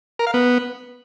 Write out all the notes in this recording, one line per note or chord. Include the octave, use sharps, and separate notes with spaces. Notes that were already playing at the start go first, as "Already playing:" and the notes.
A#4
F5
B3